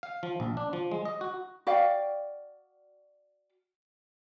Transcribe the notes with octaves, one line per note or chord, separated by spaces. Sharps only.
F5
F3
A#1
D4
F3
G#3
D#5
F#4
F#4 D5 F5 G5